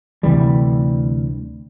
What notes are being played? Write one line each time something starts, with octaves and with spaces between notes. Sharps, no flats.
D2 C3 E3 G3